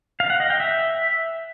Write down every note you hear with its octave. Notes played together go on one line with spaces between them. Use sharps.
F5
F#5
D#5
G5
E5